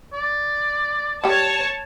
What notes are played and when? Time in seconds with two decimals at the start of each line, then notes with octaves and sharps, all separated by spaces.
0.13 D5
1.24 G3 G4 C#5 A5